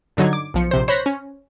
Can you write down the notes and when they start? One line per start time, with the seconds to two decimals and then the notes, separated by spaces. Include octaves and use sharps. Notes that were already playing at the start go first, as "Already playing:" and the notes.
0.17 G2 D3 F#3 D#4 G#6
0.33 D6
0.54 B1 F3 C#7
0.71 A#1 C3 C5
0.88 C5 C#5 B5 F#6 A#6 B6
1.06 C#4